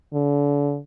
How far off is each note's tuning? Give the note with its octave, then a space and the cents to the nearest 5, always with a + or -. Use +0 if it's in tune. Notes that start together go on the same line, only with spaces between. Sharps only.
D3 -35